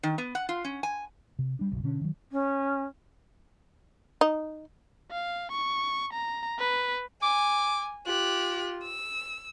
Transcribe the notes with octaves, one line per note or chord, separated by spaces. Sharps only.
D#3
B3
F#5
F4
C#4
G#5
C3
G3 D4
F#1 B1
B2 D3 C#4
D#3 F#3
C#4
D#4
F5
C#6
A#5
B4
G#5 D6
F4 G4 F#6
E6